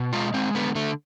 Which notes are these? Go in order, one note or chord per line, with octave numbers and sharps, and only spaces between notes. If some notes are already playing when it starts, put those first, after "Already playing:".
Already playing: B2
G#3 F4
G#3 C4
D3 B3
D3 A3